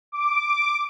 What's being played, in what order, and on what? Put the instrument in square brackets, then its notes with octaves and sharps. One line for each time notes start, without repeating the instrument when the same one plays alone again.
[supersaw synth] D6